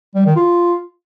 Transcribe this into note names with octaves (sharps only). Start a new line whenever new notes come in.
G3
D#3
F4